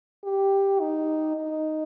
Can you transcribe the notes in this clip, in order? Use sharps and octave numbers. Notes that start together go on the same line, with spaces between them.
G4
D#4
D#4